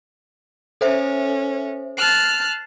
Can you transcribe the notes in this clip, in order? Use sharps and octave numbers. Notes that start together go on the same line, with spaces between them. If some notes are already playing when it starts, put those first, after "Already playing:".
C#4 A4 C5 E5
A5 F6 F#6 C7